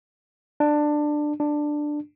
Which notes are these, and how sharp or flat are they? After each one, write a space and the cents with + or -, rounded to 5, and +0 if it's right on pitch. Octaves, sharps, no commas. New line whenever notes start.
D4 +15
D4 +10